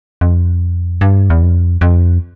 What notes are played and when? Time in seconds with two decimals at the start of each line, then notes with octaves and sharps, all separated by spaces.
0.21 F2
1.01 G2
1.30 E2
1.42 F2
1.81 F2